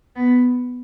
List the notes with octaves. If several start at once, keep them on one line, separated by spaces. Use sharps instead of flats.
B3